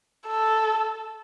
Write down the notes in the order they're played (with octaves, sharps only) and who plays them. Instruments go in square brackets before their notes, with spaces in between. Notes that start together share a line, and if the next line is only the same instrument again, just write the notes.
[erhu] A4